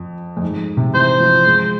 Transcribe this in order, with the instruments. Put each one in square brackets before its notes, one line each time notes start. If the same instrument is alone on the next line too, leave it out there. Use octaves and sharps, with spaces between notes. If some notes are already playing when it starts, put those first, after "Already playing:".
Already playing: [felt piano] F2
F2
G#2
C3
[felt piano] E3 [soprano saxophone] C5
[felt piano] F3
G#3